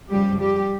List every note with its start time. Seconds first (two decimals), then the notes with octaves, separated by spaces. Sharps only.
0.10 F#2 C#3 F3 G3 G4
0.39 G3 G4